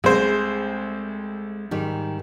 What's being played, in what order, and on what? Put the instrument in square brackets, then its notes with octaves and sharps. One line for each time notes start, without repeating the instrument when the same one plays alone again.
[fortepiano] C2 C5 [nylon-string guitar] G#3 A3 C4
[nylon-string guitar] G#2 D#3 G3